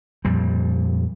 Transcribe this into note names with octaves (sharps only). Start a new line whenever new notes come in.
F2 A#2 G3